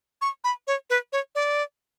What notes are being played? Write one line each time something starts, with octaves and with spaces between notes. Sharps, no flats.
C#6
B5
C#5
B4
C#5
D5